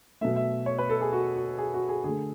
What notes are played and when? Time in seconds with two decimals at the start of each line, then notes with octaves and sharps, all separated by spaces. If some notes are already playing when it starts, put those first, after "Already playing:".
0.21 B2 F#3 A3 E5
0.36 E5
0.66 C#5
0.78 B4
0.89 A4
1.01 G#4
1.13 F#4
1.36 F#4
1.58 G#4
1.74 F#4
1.89 G#4
2.04 D3 A3 G#4